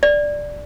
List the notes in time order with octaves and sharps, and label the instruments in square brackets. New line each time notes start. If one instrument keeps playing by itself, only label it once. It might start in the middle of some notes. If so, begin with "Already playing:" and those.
[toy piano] D5